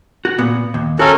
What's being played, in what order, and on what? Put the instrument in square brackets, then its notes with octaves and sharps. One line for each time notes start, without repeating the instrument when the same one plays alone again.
[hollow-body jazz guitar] F#4
A#2 B3
D#2
[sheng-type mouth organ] C#4 A4 A#4 [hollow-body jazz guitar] F#4 F5